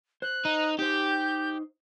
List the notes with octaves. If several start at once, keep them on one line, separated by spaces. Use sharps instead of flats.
C5 F#6
D#4
D#4 G4 C5 G6